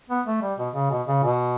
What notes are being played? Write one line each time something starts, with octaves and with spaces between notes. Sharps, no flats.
B3
A3
G3
B2
C#3
B2
C#3
B2